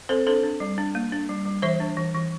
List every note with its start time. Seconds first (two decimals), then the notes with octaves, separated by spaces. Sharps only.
0.09 C4 A4 C5
0.27 D4 A4 C5
0.43 D4
0.60 G3
0.78 D4
0.95 A#3
1.12 D4
1.29 G3
1.46 G3
1.62 E3 C5 E5
1.80 D4
1.97 E3
2.14 E3